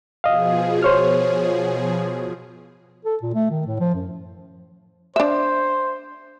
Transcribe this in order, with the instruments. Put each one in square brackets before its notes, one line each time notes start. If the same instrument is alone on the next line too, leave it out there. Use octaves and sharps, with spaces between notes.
[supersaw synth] B2 F3 G#4 [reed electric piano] D#5 F5
[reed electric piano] C5 C#5 F6
[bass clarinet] A4
A#2
A3
D#3
A2
F3
F#2
[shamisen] D4 E5 [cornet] C5